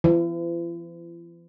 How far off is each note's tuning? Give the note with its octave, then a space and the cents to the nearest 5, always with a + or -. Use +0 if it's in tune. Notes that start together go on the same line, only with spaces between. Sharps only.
E3 +45